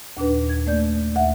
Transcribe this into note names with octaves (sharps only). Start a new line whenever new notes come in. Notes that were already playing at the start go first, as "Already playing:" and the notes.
D#2 A#2 D4 B4
G#6
A3 A#3 D5 G6
D#2 E5 F#5